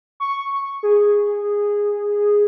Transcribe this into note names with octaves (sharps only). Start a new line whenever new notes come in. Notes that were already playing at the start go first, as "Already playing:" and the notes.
C#6
G#4